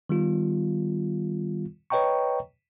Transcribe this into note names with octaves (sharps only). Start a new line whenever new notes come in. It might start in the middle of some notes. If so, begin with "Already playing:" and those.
D#3 G3 B3 F4
B4 C#5 D#5 G5 A#5 C#6